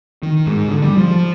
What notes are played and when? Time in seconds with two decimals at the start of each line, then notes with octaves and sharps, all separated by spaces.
0.23 D#3
0.47 G#2
0.69 D3
0.83 G3
0.98 F3